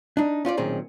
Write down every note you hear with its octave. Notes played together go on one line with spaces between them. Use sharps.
D4 D#4
C#4 F4 C5 D5
B1 A#2 D#3 C4 C#4 G#4